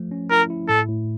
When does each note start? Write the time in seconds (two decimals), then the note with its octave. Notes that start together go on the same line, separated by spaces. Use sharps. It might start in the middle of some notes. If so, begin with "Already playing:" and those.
Already playing: F3 A3
0.11 C#4
0.31 E4 A#4
0.50 E4
0.69 A2 A4
0.88 A2